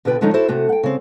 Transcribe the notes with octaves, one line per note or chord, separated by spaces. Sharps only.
B2 D3 F4 B4 G5
D3 F3 G#3 A3 C#4 D#4
E4 F#4 A4 C5
C3 A3 F#4
F#5 G5
C#3 C4